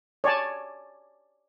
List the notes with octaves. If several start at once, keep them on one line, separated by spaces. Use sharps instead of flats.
C#5 D5 G#5 A5